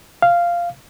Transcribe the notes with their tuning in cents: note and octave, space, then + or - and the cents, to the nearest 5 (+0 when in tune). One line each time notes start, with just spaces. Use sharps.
F5 -10